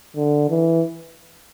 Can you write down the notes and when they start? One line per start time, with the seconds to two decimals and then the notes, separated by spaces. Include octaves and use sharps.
0.16 D3
0.49 E3